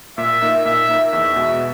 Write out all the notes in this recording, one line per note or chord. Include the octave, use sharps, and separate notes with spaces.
A#2 E5
A#3 D#4 A#4
A#2 E5
A#3 D#4 A#4
E2 E5
B2 G#3 B3